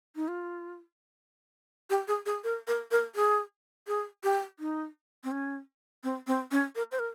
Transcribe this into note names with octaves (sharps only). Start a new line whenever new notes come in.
D#4
F4
G4
G#4
G#4
A#4
A#4
A#4
G#4
G#4
G4
D#4
C4
C#4
C4
C4
C#4
A#4
C5
A#4